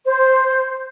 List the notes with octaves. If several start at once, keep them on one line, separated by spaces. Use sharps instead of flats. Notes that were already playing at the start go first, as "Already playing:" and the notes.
C5